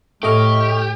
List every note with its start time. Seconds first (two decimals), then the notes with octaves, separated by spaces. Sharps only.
0.23 A2 A3 G4 D#5 C#6 F6